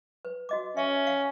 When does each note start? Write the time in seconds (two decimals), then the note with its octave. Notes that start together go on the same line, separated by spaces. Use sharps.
0.25 B4
0.49 F#4 D#5 D6
0.77 C#4 E5
1.07 F5